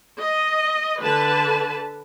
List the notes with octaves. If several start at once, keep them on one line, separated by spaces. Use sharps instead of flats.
D#5
D3 B4 A5